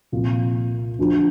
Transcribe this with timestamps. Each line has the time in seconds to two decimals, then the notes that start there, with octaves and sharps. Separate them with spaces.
0.12 C2 A#2 F3 F4
0.99 D2 D3 F3